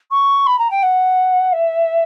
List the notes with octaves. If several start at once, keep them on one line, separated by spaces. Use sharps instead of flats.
C#6
B5
A#5
G5
F#5
E5